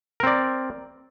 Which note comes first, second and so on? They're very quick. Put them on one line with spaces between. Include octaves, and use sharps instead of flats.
A#4 C4 D5